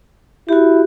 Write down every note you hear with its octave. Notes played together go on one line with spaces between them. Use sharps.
E4 F#4 G4